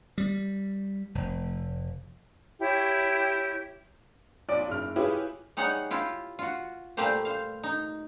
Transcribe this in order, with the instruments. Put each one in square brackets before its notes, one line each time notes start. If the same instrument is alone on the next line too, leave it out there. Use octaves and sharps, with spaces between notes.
[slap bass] G3
F1
[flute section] E4 G4 C#5
[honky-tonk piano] B1 D5 D6 D7
F#1 F6
E4 F4 G4 G#4 B4 C#5
[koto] G3 D#4 G#4 C#5 F#5
E4 F4 G4
F4 F#4
A#2 G3 A3 A#3 G4 C5
C5 F5
D#4